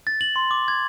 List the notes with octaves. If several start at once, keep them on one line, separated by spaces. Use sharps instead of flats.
A6
F#7
C6
D6
G#6